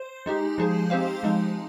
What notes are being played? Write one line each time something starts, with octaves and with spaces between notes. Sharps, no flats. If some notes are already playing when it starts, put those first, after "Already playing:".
Already playing: C5
G#3 D#4 G4
F3 G#3 D#4 G#4 C5
C4 G4 C5 F5
F3 G#3 D#4